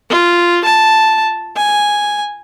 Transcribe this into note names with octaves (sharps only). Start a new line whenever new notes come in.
F4
A5
G#5